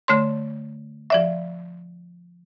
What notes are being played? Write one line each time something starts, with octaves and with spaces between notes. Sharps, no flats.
D3 A3 C#5 C6
F3 D5 E5